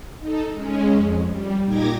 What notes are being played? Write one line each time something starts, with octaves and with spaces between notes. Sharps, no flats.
D#4 A4
G#3 C#4
F2
G3
A#2 D#4 G4 D6 G#6 A#6